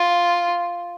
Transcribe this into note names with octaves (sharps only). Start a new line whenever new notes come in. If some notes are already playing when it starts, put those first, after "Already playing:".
Already playing: F4